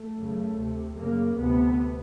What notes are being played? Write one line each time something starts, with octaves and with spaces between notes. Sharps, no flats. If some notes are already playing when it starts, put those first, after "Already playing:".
Already playing: A3
F#2 C#3
D2 C3
F#2 C#3 A#3
D2 C3 B3